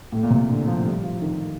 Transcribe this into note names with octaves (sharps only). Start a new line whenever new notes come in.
A2
A#2
C3
D3
F3
G3
F3
D#3